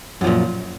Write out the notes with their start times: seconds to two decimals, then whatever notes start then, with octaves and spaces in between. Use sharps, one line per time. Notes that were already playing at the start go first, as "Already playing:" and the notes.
0.21 F#2
0.24 F3
0.27 A#2